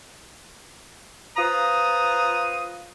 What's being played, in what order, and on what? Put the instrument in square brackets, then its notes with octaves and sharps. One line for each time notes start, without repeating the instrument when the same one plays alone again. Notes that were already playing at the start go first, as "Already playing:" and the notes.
[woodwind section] F4 B4 C5 A#5 D#6